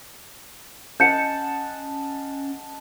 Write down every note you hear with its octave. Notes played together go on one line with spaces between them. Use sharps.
C#4 D#5 F#5 A5 G6 C#7